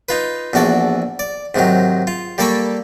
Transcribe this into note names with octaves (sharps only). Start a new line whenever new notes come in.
D#4 F4 B4
A#1 E2 F#4 A4 D5
D5
G#2 C3 D#3 F#3
F4
G3 A#3 A4 D5 B5 C#6